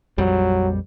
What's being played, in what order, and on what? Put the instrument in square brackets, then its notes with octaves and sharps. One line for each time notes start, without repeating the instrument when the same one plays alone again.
[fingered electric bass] A#1 F2 G3 [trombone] F#3